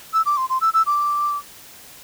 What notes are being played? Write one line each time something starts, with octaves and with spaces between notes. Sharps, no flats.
E6
D6
C6
C6
E6
E6
D6